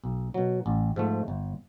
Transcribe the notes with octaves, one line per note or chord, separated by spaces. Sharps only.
B1
B2 F#3
A1
G#2 F3 A3
G1